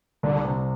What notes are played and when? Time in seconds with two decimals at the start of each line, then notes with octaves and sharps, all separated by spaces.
0.23 C2 D3
0.44 C3